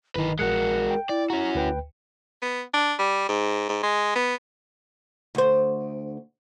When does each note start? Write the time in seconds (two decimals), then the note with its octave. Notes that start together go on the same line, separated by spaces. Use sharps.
0.16 G1 D#3 D#4 E4 B4
0.39 A#1 G#3 F#4 A#4 F#6 C#7
0.91 G5
1.09 E4 D5
1.30 C#4 F#4 A#5
1.55 D2 B4 G5
2.42 B3
2.74 D4
2.99 G3
3.29 G#2
3.69 G#2
3.83 G#3
4.16 B3
5.35 D2 C5